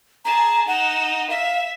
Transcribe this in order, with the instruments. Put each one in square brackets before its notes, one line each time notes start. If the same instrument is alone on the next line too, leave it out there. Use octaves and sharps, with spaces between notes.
[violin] G#4 A5 [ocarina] A#5
[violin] D#4 E7 [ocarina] F#5
[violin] E5 [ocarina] F5